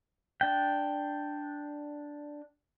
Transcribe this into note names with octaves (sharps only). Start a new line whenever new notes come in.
D4 G5